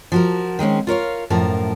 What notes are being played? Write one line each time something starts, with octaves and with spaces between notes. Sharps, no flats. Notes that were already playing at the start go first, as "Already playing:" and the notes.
F3 F#4 A#4
D#3 G#3 C4 C#4
F4 A#4 C#5 F5
F#2 A2 F3 A#4 A5